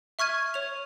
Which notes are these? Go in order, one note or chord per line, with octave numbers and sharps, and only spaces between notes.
E5 C#6 F6 G#6 D#7
C#5 F7